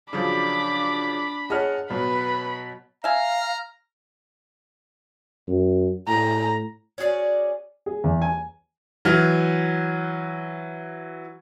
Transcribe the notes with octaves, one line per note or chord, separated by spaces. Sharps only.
C#3 F3 F#3 D4 B5 D6
G#4 C#5 D#5 F#5 A5 F6
B2 F#3 B3 B4 B5
E5 F5 G#5 A#5 F6
F#2
A2 A#5
C#4 F#4 G#4 D5
G#4
E2
G#5
E3 F#3 F6